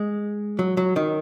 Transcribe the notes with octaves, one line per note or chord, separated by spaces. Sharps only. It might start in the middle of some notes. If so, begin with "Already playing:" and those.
Already playing: G#3
F#3
F#3
D#3